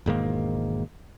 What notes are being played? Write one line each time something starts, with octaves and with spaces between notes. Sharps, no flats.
E1 G#2 D#3 A#3